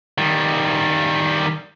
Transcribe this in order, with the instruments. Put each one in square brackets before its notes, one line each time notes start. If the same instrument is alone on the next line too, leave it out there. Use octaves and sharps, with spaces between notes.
[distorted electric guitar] D#3 G3